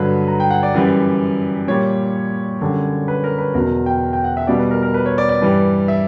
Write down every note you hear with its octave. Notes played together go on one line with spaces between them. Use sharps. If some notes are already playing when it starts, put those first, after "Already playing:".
Already playing: G2 D3 F#3 B4
A#5
G5
F#5
D5
F#2 E3 G3
A#2 G3 C#5
F#2 D3 G3
B4
A#4
B4
E2 B2 F#3 A#4
G5
G5
F#5
E5
B2 G3 D5
B4
A#4
A#4
B4
C#5
D5
D5
G2 E3 G3
E5